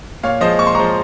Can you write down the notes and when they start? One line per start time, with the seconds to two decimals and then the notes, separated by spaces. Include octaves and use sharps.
0.23 A#2 C#5 F5
0.41 F3 G#3 C5 D#5
0.59 A#2 C#6
0.67 C6
0.75 F3 G#3 A#5 C#6